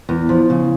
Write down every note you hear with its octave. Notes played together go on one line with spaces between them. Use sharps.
E2
F3
C#3